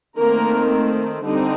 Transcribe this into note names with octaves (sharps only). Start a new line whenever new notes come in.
D#3 A3 A#3 C4 A#4
D3 G3 C4 D#4